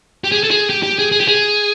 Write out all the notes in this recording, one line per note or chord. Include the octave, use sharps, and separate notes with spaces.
G4
G#4
A4
G#4
G4
G4
G#4
G#4
G4
G#4